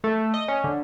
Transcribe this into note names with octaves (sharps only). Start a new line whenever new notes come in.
A3
D#5
C#4
D3